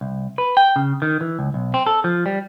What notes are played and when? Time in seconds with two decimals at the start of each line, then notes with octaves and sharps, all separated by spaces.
0.01 C2
0.38 B4
0.57 G5
0.76 C#3
1.02 D#3
1.21 E3
1.39 C#2
1.54 B1
1.74 C4
1.87 A4
2.04 F3
2.26 G3